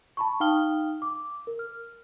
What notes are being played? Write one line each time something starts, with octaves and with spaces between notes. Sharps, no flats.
A5 B5 C#6
D#4 F5 G5 D#6 F6 G7
D6
A#4
F6